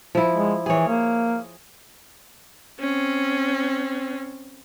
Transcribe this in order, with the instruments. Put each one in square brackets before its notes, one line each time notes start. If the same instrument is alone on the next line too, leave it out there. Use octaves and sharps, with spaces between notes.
[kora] F3 E4
[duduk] G#3
[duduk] E3 [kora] G#4 C#5
[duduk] A#3
[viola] C4 C#4